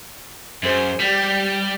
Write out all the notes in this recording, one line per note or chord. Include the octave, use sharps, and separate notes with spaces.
F#2 G#4 C5
G3 G4 D5